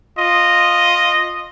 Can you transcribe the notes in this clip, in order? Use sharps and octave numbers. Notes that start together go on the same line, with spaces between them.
F4 D#5